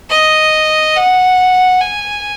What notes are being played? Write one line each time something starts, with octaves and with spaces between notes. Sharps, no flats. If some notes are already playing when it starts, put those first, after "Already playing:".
D#5
F#5
G#5